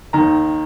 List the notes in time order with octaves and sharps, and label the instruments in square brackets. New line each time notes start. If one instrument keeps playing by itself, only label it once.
[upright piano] D#2 D#3 A#5